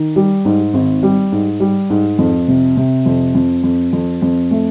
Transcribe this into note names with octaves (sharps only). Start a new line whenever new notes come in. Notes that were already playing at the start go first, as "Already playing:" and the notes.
Already playing: D#3
G3
G#2
G#1
G3
G#2
G3
G#2
F2
C3
C3
F2
F2
F2
F2
F2
A3